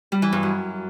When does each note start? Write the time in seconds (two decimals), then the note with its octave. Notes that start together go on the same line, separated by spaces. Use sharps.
0.12 G3
0.22 E3
0.33 G2
0.43 F#2